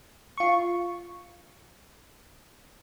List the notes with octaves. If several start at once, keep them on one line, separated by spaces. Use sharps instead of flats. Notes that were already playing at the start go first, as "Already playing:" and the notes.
F4 C#6